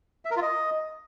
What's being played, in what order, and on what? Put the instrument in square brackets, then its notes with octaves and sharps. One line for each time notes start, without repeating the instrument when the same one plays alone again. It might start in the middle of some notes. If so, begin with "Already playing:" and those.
[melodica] E5
A#4
F4
D#5